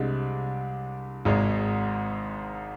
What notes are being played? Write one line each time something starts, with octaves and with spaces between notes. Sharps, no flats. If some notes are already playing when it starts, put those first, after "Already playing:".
Already playing: C2 C3 G#3 D4
G#1 G#2 G#3